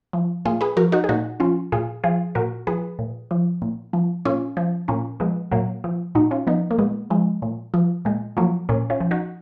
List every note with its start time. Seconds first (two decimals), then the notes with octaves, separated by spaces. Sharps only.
0.13 F3
0.45 A#2 F4 G#4
0.61 G#4 B4
0.77 F3 F#4 A#4
0.92 D#4 F#4
1.04 G#4
1.09 A#2 D#4 F#4
1.40 F3 C#4 F4
1.72 A#2 F4 G#4
2.04 F3 F4 G#4
2.35 A#2 F#4 A#4
2.67 F3 G#4 B4
2.99 A#2
3.31 F3
3.62 A#2
3.93 F3
4.25 A#2 C#4 F4
4.57 F3
4.88 A#2 A#3 C#4
5.20 F3 G#3 B3
5.51 A#2 F#3 A#3
5.84 F3
6.15 A#2 D#4 F#4
6.31 C#4 F4
6.47 F3 B3 D#4
6.71 A#3
6.78 A#2 G#3 B3
7.10 F3 G#3
7.42 A#2
7.74 F3
8.05 A#2 G#3
8.37 F3 F#3 A#3
8.69 A#2 A#3 C#4
8.90 C#4 F4
9.01 F3
9.11 D#4 F#4